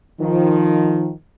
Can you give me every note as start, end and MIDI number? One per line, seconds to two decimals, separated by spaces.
0.20 1.10 51
0.20 1.10 53